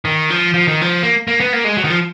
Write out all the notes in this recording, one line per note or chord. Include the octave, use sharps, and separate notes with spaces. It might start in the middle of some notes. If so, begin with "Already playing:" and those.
D#3
F3
F3
D#3
F3
A#3
A#3
B3
A#3
G#3
F#3
D#3
F3